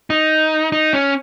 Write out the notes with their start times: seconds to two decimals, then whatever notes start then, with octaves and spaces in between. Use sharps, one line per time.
0.10 D#4
0.72 D#4
0.93 C#4